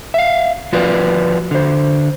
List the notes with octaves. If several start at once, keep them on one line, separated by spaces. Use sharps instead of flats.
E5 F5
F3 F4 F#4 B4 D5
D3 C5